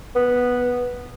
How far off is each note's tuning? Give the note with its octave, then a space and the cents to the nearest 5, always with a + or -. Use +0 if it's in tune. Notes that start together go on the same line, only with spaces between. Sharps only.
B3 -5